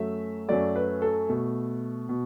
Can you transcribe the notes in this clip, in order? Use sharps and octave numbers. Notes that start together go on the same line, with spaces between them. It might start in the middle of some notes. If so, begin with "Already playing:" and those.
Already playing: F#2 F#3 A3 E5
F#2 F#3 A3 D5
B4
A4
B2 A3
B2